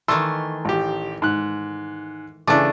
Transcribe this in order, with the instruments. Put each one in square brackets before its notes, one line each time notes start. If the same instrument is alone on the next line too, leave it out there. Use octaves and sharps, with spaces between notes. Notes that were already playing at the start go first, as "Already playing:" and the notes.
[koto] D#3 E3 A3 [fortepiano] C6 E6
[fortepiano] A1 G4
G#2 F#6
[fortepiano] C#3 E3 D6 [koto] A3 D4